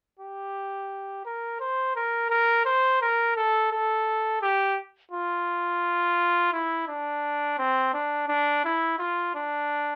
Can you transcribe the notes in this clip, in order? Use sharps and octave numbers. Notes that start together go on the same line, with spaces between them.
G4
A#4
C5
A#4
A#4
C5
A#4
A4
A4
G4
F4
E4
D4
C4
D4
D4
E4
F4
D4